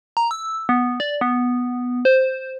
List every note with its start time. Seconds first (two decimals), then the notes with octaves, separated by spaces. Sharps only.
0.17 A#5
0.31 E6
0.69 B3
1.00 D5
1.21 B3
2.05 C5